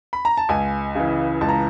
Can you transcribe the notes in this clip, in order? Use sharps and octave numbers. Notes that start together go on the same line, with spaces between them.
B5
A#5
A5
C#2 G#5
C#3 E3
C#2 A5
A#5